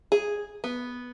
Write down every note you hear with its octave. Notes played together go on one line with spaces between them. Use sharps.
G#4
B3